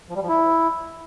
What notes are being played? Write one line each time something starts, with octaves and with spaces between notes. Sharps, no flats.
F3
G3
F3
E4